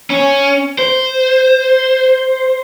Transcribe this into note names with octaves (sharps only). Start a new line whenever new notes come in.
C#4
C5